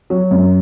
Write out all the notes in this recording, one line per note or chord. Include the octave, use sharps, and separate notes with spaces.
F#3
F#2